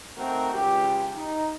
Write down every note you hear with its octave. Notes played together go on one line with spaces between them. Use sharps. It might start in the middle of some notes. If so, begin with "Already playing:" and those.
A3 C4 D#4 F#4 A#4
C#2 G4
D#4